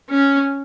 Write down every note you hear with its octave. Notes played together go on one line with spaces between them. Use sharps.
C#4